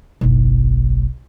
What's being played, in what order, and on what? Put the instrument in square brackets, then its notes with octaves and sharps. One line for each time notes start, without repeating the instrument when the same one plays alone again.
[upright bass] F#1 B1